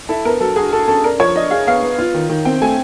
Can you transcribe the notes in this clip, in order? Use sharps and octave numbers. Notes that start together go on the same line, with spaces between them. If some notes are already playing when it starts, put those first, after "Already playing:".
E4 A4
B3 A#4
F#3 A4
F#4 G#4
F#4 A4
C#4 A4
D4 A#4
F3 C#5
D4 D#5
G#4 F5
B3 F5
B3
F4
D#3
D#3
C4 G5
A3 G#5